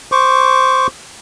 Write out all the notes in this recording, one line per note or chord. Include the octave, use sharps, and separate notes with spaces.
C5 C#6 D6